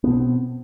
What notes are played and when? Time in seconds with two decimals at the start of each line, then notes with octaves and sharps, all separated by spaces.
0.04 B3
0.07 B2
0.10 C4